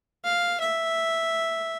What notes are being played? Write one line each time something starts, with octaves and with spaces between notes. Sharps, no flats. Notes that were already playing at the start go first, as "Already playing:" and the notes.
F5
E5